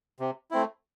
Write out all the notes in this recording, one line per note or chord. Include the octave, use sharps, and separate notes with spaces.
C3
A3 C4 E4